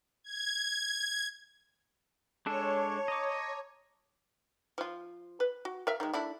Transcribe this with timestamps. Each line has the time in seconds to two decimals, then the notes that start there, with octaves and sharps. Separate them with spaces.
0.24 G#6
2.46 G#3 D4 A4 C#5 A5
3.08 D#5 A#5 D6
4.78 F3 F4
5.40 B4
5.65 F#4
5.87 A#4 E5 F5
6.00 D#3 G#3
6.14 A3 D4 E4